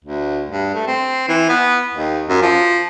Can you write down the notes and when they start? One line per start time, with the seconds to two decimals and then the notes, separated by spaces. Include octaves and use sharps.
0.04 D2
0.50 G2
0.75 A3
0.87 C4
1.28 E3
1.49 B3
1.94 D#2
2.29 F#2
2.42 F3